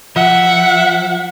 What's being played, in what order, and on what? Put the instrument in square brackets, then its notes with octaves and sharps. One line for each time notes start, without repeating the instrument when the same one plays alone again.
[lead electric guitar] F3 [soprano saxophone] E5 [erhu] F#5